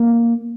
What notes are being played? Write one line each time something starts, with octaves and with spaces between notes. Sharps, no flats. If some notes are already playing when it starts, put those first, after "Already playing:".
Already playing: A#3